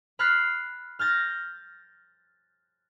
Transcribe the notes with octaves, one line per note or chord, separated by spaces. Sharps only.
B5 F6 F#6 A6 B6 C7
F6 G6 A6 A#6